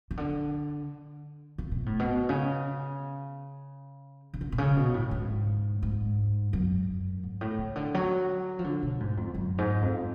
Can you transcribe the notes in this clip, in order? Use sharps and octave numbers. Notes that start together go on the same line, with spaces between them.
C#3
D3
C#3
B2
A2
B2
C#3
C#3
D3
B2
C#3
B2
A2
G#2
G#2
F#2
G#2
A2
C#3
D3
F#3
F3
D3
B2
G#2
F2
F#2
G#2
F2